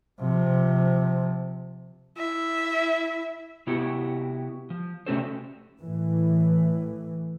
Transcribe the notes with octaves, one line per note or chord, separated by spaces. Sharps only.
C3 F3
E4 E5
C3 B3 E4 F#4 G4
F3
C3 A3 C#4 F#4 A4 C5
A2 E3